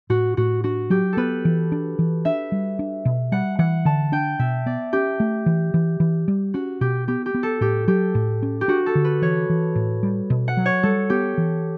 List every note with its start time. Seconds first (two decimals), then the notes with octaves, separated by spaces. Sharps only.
0.10 A2 F#4
0.37 A2 F#4
0.64 D4 F#4
0.90 F#3 G4
1.13 B3 A4 B4
1.45 E3
1.72 D4
1.99 E3
2.25 D4 E5
2.52 G3
2.79 D4
3.05 B2
3.32 G3 F#5
3.59 E3 F#5
3.85 D3 A5
4.12 D4 G5
4.39 B2 E5
4.66 B3 D5
4.93 C#4 G4
5.20 A3
5.46 E3
5.74 E3
6.00 E3
6.28 G3
6.54 C#4 F#4
6.81 B2 G4
7.08 B3 G4
7.26 G4
7.34 B3
7.43 A4
7.61 A2 G4
7.88 F#3 G4
8.15 A2
8.42 C#4
8.61 G4
8.68 D4 F#4
8.86 A4
8.95 D3
9.05 B4
9.22 E3 C#5
9.50 E3
9.75 A2
10.03 G3
10.30 B2
10.48 F#5
10.57 F#3
10.66 C#5
10.83 G3 A4
11.10 B3 G4
11.38 E3